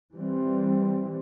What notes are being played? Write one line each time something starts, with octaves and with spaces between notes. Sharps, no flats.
E3 G3 C4